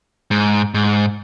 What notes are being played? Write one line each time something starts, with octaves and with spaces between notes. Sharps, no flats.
G#2
G#2